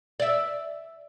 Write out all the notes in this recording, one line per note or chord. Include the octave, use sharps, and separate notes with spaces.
D5 E5